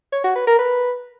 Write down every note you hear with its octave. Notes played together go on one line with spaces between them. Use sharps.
C#5
F#4
B4
A#4
B4